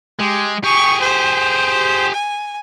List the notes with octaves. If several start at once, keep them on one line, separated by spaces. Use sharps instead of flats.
G#3 G4
G4 G#4 C#6
C5
G#5